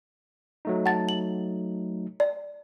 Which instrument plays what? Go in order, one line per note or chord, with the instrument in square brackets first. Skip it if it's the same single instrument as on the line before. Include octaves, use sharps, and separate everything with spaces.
[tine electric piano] F#3 A3 D#4
[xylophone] F#5 A5 A6
F#7
D5